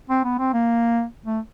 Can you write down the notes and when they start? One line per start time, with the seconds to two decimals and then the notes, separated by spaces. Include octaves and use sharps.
0.09 C4
0.24 B3
0.39 C4
0.53 A#3
1.26 A3